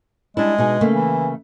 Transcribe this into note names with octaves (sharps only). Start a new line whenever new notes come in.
G3 G#3 D4 E4
B2 D#4 G#4
C#3 A3 A#3
E3